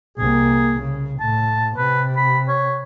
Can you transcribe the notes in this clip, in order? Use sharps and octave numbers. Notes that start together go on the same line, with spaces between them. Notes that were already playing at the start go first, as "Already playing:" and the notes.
C2 A#3 G#4
C#3
A2 A5
C3 B4
B5
C#5